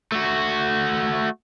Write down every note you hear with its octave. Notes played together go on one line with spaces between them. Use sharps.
A3 F#4